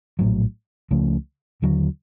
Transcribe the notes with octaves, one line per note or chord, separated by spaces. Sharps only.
A#1 A2 F#3
C#2 C#3 F3 A3
D#2 D3 F#3